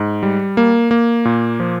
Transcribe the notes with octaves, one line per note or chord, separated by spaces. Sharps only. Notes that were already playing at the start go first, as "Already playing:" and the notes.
Already playing: G#2
G3
A#3
A#3
A#2
F3